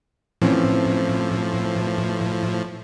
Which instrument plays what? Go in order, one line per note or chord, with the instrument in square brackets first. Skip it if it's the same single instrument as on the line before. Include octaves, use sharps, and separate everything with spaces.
[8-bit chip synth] A2 F3 [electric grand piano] E3 C4 C#4